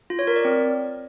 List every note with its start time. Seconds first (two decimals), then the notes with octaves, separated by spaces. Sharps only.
0.10 F4
0.19 C#5
0.27 A#4
0.36 D5
0.45 C4